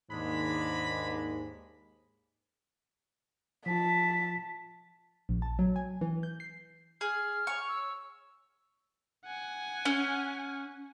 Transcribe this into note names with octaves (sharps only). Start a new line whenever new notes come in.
D#2 G#2 G#3 D4 B5
F3 F4 A5 B6
A#1
A5
F#3
G#5
E3
G6
C7
G#4 F6
C#5 C#6
E6
F#5 G#5
C#4